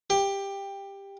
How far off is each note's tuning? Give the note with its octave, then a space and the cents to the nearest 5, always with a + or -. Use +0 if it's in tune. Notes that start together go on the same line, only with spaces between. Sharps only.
G4 +15